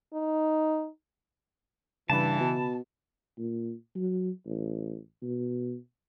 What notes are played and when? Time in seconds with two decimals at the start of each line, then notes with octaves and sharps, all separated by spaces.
0.13 D#4
2.10 G2 C#3 E3 A5 B5
2.40 B2
3.38 A#2
3.96 F#3
4.46 A1
5.22 B2